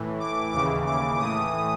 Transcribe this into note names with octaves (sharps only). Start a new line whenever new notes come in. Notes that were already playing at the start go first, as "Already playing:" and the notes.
Already playing: A2 E3
D6
D#2 C#3 E3 D6
D6
A2 E3 D#6